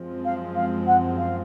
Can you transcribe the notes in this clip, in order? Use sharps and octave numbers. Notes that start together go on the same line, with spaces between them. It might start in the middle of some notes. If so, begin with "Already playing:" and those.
Already playing: F#2 F3 G#3 C4
F5
F5
F#5
F5